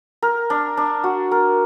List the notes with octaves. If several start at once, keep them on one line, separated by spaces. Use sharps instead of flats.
A#4
D4
D4
F#4
A#4